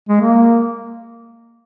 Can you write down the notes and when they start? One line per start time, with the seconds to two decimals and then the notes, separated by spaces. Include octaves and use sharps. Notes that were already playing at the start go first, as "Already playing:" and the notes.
0.09 G#3
0.21 A#3